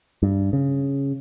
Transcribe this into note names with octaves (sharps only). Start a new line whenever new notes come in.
G2
C#3